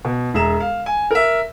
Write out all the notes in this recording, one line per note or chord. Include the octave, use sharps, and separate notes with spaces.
B2
E1 G#4 E5 A#5 E7
F5
G#5
A#4 E5